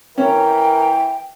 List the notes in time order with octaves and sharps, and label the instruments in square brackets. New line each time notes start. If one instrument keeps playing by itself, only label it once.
[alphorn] E3 [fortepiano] C#4 [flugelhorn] A#4 [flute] G5